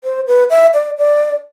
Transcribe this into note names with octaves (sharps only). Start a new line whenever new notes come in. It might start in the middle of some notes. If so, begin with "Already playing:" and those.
C5
B4
E5
D5
D5